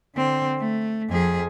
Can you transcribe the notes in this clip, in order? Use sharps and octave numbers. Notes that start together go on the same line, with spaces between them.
D3 C4
A3
F2 G#4